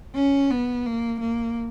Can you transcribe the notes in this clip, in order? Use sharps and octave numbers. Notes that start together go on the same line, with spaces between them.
C#4
B3
A#3
A#3